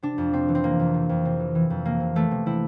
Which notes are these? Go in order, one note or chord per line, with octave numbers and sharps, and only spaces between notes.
C3 D4
F2
C3 C4
E3
C4
C3 A#3
F2
C3
F2
C3
E3
E3
F2
C3 A#3
C3
E3 A3
C3
C3 E4